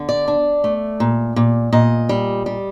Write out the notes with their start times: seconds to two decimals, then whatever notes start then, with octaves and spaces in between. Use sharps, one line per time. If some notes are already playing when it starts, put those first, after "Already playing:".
Already playing: D3
0.09 D5
0.28 D4
0.64 A3
1.00 A#2
1.36 A#2
1.73 A#2 D#5
2.09 G3
2.46 G3